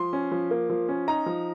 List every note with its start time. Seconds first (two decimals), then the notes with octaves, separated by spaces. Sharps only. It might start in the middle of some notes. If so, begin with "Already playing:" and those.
Already playing: F3 C6
0.13 C#4
0.32 F3
0.51 A#3
0.70 F3
0.89 C#4
1.08 D#4 A#5
1.26 F3